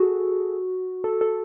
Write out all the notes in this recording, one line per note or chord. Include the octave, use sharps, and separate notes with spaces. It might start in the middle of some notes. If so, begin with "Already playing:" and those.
Already playing: F#4 G#4 A4
A4
A4